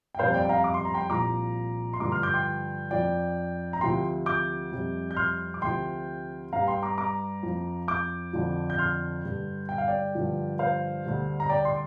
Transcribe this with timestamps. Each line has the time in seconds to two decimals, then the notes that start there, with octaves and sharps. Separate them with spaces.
0.15 G5
0.19 F2 C3 G3 C5 F5
0.34 D5 G5
0.45 G5
0.49 F5 A#5
0.64 D6
0.74 C6
0.85 A#5
0.94 G5 C6
1.09 C2 A#2 F3 A#5 D6
1.93 C6
2.00 G2 D3 F3 A#5 D6
2.11 C6 F6
2.23 D6 G6
2.34 G5 C6
2.91 F2 F3 D5 G5
3.73 A#5
3.81 D2 C3 F3 G5 C6
4.26 D6 G6
4.72 F2 C3 G3
5.11 G6
5.17 C6 F6
5.54 D6
5.61 D2 C3 F3 G5 C6
6.52 G2 G3 F5 A#5
6.67 G5 C6
6.82 A#5 D6
6.98 A#5 D6
7.43 F2 F3
7.88 D6 G6
8.33 F2 D3 F3
8.70 G6
8.78 C6 F6
9.24 G2 D3 G3
9.69 G5
9.78 F5
9.88 D5 G5
10.15 G2 D3 F3
10.59 C5 F5
11.05 D2 D3 G3
11.40 A#5
11.49 D5 G5
11.65 C6